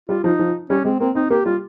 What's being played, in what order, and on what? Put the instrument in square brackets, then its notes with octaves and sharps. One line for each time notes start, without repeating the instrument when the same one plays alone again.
[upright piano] G3 [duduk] F4
[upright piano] F3 [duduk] D#4
[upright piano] F3
[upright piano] G3 [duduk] C#4
[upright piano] G#3 [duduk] C4
[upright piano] A#3 [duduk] C4
[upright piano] C4 [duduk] D#4
[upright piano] A#3 [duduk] G4
[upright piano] G3 [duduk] F4